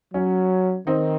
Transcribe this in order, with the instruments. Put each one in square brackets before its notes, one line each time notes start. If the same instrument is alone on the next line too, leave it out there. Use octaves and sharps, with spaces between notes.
[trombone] F#3 [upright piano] C#4
[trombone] D#3 [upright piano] C4 D#4